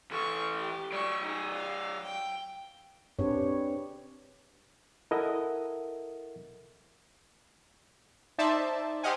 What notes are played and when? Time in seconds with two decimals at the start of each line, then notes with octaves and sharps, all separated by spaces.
0.11 E3 A4 C#6
0.57 G4
0.92 F#3 D5 C#6
1.22 D#4 G#4
1.53 F5
2.04 G5
3.19 C4 D4 G4 G#4 B4 C#5
5.11 E4 A4 A#4 D#5 E5 F#5
8.38 D#4 C5 D5 E5 A5
9.03 G4 C5 D#5 F5 F#5 G#5